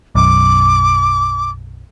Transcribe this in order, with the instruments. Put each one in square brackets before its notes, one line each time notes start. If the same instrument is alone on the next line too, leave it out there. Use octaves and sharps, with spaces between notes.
[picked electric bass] B1 F#2 [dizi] D6